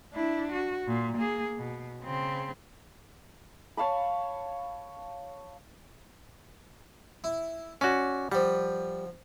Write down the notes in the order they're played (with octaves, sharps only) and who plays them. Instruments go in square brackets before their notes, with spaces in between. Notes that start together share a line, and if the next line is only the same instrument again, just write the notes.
[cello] D4 E4
F#4
A#2
A#3 G#4
B2
C#3 C4
[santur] C#5 F5 A5 B5
[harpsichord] E4
[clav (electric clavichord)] C#4 F#4 [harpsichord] D5
[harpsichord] F3 F#5 [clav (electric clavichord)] G3